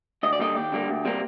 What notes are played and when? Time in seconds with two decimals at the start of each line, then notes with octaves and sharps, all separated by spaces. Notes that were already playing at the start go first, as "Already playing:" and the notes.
0.23 D2 D#5
0.33 D5
0.39 D3 G3 A#3 D#5
0.55 D#2 G4
0.72 D3 G3 A#3
0.88 D2
1.05 C3 G3 A#3